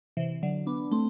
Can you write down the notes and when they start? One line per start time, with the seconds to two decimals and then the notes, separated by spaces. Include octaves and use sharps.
0.17 C3 E3
0.43 D3 F#3
0.66 B3 D4
0.91 A3 C4